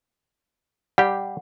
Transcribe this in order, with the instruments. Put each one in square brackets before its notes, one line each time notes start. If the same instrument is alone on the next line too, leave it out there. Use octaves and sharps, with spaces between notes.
[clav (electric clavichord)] G3 G4 [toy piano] F#5